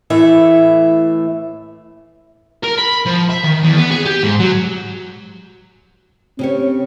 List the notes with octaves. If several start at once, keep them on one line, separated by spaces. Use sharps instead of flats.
A2 E3 A3 E5
A#4
B5
F3
E5
D#3
E2
B3
G#4
G4
G#2
F#3
C#3 C4 G4 C#5